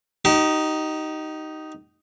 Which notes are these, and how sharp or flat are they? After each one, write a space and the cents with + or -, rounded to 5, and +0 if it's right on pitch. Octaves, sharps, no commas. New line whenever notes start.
D#4 +0 G4 -35